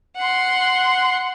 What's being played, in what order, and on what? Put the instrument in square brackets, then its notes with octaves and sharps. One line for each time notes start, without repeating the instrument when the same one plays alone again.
[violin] F#5 C6